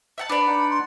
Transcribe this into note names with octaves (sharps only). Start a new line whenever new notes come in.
E5 F#5 A5
D4 B4 D5 B5
D#4 F#5 A5
C6